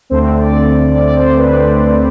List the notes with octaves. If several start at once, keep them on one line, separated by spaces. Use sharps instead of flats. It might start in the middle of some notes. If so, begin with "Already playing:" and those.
D2 D3 A3 C4 C5
D5
D5
C5
B4